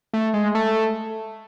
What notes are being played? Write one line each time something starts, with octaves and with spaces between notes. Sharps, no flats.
A3
G#3
A3